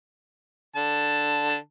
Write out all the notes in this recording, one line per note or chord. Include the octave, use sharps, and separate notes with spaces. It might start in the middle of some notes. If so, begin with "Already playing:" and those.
D3 A5